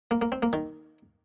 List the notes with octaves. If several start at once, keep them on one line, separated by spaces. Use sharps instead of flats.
A#3
A#3
C4
A#3
D#3